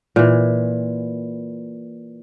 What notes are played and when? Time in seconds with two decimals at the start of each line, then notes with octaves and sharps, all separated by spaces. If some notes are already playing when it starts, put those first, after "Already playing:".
0.16 A#2 E3